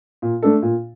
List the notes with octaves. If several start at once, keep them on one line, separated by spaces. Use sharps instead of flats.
A#2
A3 D4 A4
A#2